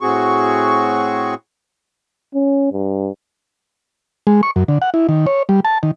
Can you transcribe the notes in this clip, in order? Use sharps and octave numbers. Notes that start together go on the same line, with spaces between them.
A2 C4 F#4 G#4 C#6
C#4
G2
G#3
C#6
F#2
D3
F#5
E4
D#3
C#5
G3
A5
D#3